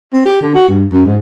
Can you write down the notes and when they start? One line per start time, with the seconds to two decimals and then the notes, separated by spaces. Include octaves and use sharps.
0.13 C4
0.26 G4
0.41 D3
0.55 F#4
0.68 G2
0.93 F#2
1.06 G#2